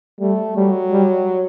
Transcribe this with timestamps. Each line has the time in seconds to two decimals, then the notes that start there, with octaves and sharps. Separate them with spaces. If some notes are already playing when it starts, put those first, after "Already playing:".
0.20 G3 A3
0.56 F#3 G3
0.92 G3